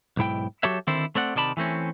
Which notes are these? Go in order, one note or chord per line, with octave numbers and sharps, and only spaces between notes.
B1 G#2 E4 G5
F#3 F#4 G4 A4 C#5 E5
D3 D#3 C4 E4 A4 C5
A3 C4 D5 F#5
C3 D#3 D5 A5 B5
E3 A3 C4 C#4